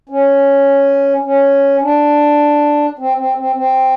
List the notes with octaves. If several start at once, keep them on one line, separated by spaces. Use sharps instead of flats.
C#4
C#4
D4
C4
C4
C4
C4